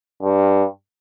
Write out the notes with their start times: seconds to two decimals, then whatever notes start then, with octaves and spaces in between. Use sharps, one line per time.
0.22 G2